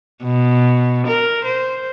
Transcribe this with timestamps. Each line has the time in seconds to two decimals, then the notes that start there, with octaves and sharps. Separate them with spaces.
0.24 B2
1.07 A#4
1.45 C5